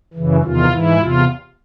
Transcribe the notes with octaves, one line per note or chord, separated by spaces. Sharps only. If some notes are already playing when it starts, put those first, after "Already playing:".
F#2 C#3 E3
E2 C3 D#3 F4
G#2 E3 E4
E2 C3 F4